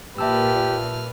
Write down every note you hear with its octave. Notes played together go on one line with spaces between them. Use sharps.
A#2 G4 B4 E5 A5 E6 F6